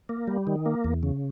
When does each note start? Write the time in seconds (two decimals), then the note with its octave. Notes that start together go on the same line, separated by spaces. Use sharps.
0.09 A#3
0.28 G3
0.47 D#3
0.66 A#3
0.84 E2
1.03 C#3